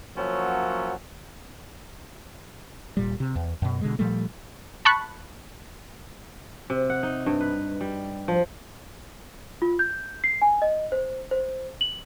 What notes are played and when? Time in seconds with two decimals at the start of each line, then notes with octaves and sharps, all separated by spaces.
0.16 F3 F#3 A#3 C#4 E5 F#5
2.97 D#1 A#2 G3
3.20 C3
3.36 E2
3.62 F#2 B2
3.81 B2 D3 G#3
3.99 A#2 F3 G3 A3
4.85 A5 B5 C#6 F#6
6.70 C3
6.90 F#5
7.03 D#4
7.26 G2
7.41 B4
7.81 G3
8.28 F3
9.62 F4
9.79 G6
10.24 C7
10.42 G#5
10.62 D#5
10.92 C5
11.31 C5
11.81 F#7